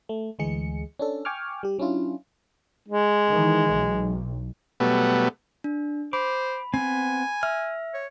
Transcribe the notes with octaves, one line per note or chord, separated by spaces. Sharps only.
A3
D2 E3 G#3 G#4 C#7
C#4 D4 A4
G5 G#5 C#6 D6 F6
G3 G4
F#3 C#4 D4 E4 F4
G#3
D#3 E3
B1
B2 F#3 G3 A3 B3
D4
C5 B5 D6
B3 C4 G#5
E5 F6
C#5